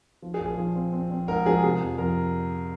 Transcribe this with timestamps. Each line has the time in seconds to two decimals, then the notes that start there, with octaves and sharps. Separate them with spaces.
0.22 F3
0.34 G#4
0.40 A#1
0.46 G#4
0.58 F3
0.75 C4
0.93 C4
1.11 C4
1.28 G#2 A#4
1.45 F3 G#4
1.64 C3 G#4
1.81 F2
1.98 F2 A#4